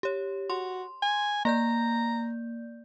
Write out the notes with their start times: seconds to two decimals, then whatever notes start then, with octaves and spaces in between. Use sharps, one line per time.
0.03 G4 C#5
0.50 F#4 C6
1.02 G#5
1.45 A#3 D5 A#5 G6